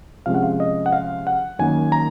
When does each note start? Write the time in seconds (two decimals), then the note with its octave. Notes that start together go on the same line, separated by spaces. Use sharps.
0.26 C3 F3 G#3 C#4 F5
0.34 F#5
0.43 F5
0.60 D#5
0.86 F#5
0.93 F5
1.27 F#5
1.59 F#2 D#3 A#3 G#5
1.92 A#5